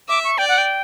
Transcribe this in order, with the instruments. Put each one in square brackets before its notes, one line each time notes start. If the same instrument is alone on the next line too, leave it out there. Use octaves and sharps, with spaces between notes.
[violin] E5 [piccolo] D6
[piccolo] C#6
[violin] D5 [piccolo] G5
[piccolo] F#5
G5